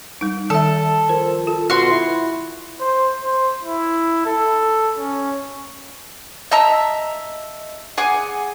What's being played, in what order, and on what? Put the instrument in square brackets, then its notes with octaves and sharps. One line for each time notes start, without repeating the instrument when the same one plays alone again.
[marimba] G3 D#4
[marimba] D#3 E5 [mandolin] A4
[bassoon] F3 [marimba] A#4
[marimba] F4 [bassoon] A4
[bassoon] B2 [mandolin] F#4 C6
[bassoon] E4
[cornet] C5
C5
E4
A4
C#4
[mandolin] D#5 E5 A5 A#5
G#4 F#5 G#5 D6